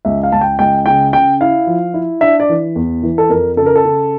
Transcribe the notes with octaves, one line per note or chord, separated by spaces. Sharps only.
C#2 E5
F5
C#2 A5
G5
C#2 G5
C#3 G5
C#3 G5
E4 F5
F3
E4
D4 E5
D5
E3
E2
E3
A4
F2 A#4
C#3 A4
A#4
A4
C#3